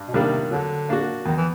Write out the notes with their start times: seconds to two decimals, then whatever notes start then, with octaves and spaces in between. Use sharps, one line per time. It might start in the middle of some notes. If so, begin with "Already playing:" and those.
Already playing: G2
0.08 B2
0.14 C3 D#3 G3 A#3 D4
0.51 D3 F#3
0.89 A#3 D4 F#4
1.26 E2 D#3
1.37 E3